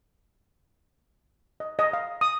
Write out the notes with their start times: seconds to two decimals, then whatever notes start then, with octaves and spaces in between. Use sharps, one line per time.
1.60 D#5
1.79 D#5
1.93 F5
2.21 D#6